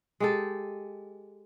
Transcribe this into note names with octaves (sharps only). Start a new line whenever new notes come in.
G#3 G4 A4